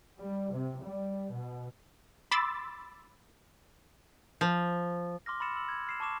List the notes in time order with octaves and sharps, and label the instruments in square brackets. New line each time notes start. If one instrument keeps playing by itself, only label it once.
[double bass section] G3
C3
G3
B2
[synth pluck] B5 C6 D6 E6 A6
[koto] F3
[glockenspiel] C6 D6 F6 A#6
B5 C6 E6 A6 C#7 E7
E6 F#7
G#6
F6 C7 E7
A5 C#6 D6 E7